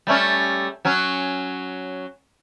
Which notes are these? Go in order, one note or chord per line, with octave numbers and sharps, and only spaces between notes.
G3 A3 C#4
F#3 C#4